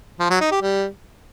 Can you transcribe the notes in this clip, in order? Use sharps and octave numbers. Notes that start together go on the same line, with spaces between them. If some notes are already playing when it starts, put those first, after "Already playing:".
F3
F#3
D#4
G4
G3